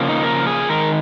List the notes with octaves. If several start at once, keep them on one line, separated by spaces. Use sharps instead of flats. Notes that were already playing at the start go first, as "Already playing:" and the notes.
Already playing: C#3 F3 A#3
D#4
A#4
G#4
D#3 G#3 A#4